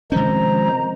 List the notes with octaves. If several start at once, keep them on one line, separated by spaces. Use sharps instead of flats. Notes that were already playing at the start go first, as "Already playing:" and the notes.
C3 D#3 F3 G#3 C#4 C5 A#5